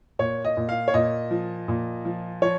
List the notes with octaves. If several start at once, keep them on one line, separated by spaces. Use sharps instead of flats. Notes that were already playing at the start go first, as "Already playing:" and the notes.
A#2 C#5
D#5
A#2
F5
C#5
A#2 D#5
F3
A#2
F3
F3 C#5